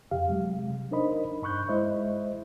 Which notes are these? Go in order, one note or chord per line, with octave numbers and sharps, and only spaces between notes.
F2 C3 G4 F5
C3 F#3 G#3
D4 D#4 A#4 C5 D#5 B5
G2 B5 C#6 F#6 G6
G#3 E4 C5 D#5 E5